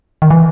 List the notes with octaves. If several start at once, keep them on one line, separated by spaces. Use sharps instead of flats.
D#3
E3